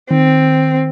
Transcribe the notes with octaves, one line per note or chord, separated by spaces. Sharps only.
D#3 C4